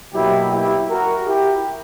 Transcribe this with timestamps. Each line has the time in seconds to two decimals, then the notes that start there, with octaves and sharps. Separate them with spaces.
0.13 B2 F#3 A#3 E4 G4
0.51 E4 G4
0.90 F#4 A#4
1.26 E4 G4